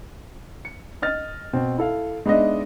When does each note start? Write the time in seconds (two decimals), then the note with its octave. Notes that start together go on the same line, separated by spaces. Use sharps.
0.65 C#7
1.02 D#5 F6 A6
1.53 B2 C4
1.78 E4 A4 F5
2.26 G#3 B3 D4 D#4 D#5 E5